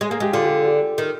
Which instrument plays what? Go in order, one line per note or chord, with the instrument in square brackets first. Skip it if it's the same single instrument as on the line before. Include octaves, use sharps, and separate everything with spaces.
[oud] G#3 [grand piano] G#4
[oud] A#3 [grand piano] G#4
[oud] G#3 [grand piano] G4
[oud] D3 [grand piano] F4
[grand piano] G4
G4
[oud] D#3